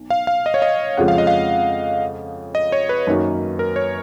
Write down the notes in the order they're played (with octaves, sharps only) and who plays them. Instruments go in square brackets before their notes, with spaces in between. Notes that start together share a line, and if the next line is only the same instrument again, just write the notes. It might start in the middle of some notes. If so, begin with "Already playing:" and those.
Already playing: [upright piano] B1
[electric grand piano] F5
F5
D#5
C#5
D#5
[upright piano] F2 C#3 F3 G#3 [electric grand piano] F#5
[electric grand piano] F5
D#5
F5
D#5
C#5
B4
[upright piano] F#2 D#3 A#3 D#4 F#4
[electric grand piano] A#4
C#5